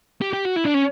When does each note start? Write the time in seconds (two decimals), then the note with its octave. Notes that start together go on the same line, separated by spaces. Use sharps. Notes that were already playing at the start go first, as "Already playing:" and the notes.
0.22 G4
0.33 G4
0.45 F#4
0.56 E4
0.66 D4
0.75 C#4